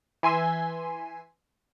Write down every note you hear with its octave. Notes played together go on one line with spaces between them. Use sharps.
E3 G#5 C6 E6 B6